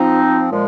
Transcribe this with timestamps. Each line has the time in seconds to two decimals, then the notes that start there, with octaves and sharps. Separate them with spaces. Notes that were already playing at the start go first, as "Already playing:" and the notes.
Already playing: F3 C4 D#4
0.51 A#2 F3 G#3